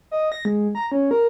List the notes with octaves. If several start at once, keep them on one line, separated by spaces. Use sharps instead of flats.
D#5
A#6
G#3
A#5
C#4
A#4